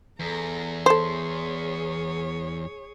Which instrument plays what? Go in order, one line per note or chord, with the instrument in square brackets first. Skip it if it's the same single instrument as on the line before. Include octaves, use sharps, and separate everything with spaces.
[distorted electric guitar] E2 [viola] A4 A#5
[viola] G#4 C#5 [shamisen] A4 C5 [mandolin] C6